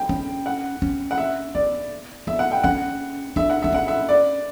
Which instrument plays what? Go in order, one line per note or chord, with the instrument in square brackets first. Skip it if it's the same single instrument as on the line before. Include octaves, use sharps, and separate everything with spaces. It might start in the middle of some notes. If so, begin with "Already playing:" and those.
Already playing: [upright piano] G5
[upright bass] C#4
[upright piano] F#5
[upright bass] C#4
[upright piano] F#5
E5
[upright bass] B3 [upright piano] D5
[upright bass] B3 [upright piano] E5
[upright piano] F#5
G5
[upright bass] C#4 [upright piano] F#5
[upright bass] D4 [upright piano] E5
[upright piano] F#5
[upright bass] D4 [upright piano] E5
[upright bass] C#4 [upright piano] F#5
[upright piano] E5
D5